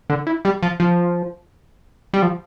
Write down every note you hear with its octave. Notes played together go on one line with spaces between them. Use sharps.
D3
E3
G3
F3
F3
G3
F3